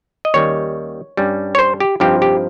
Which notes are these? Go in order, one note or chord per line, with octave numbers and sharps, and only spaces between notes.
D#5
D#2 D#3 G3 C#4 C#5
G2 G3 C#4
C#5
C5
G4
G2 F3 C4 D#4 G4
G4